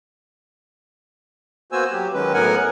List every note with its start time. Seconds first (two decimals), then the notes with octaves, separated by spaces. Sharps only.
1.72 A#3 B3 F#4 C5 G#5 E6
1.92 F#3 G4
2.14 D#3 F#3 G#3 C#4 B4
2.34 A2 F#3 B3 A#4 F#5 G#5